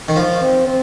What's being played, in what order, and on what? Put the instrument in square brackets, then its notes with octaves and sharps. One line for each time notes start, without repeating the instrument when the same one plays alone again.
[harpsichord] D#3
F3
[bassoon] C4
C4